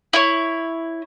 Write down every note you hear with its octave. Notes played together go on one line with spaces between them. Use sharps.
E4 C#5